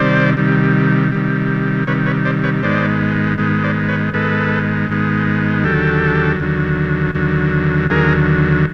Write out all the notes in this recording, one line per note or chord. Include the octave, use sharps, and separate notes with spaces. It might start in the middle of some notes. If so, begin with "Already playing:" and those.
Already playing: C3 D#3 G3 C5 D5
C3 D#3 G3
C3 D#3 G3
C3 D#3 G3 B4 C#5
B4 C#5
C5 D5
B4 C#5
G#2 D#3 G#3 B3 C5 D5
G#2 D#3 G#3 B3
C5 D5
B4 C#5
G#2 D#3 G#3 B3 A4 B4
G#2 D#3 G#3 B3
D#2 D3 F#3 G4 A4
D#2 D3 F#3
D#2 D3 F#3
D#2 D3 F#3 G#4 A#4